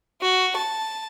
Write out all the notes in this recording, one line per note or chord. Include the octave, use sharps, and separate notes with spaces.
F#4
A5